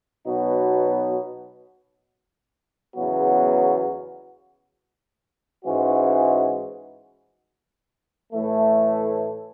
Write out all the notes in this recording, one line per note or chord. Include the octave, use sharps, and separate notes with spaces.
B2 F#3 B3 D#4 F#4
E2 C#3 F#3 B3 F#4
G#2 E3 G#3 C#4 F#4
A2 E3 A3